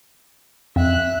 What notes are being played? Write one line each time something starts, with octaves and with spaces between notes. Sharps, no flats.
F2 E5 F#6